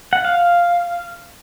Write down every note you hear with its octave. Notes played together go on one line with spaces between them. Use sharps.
F#5
F5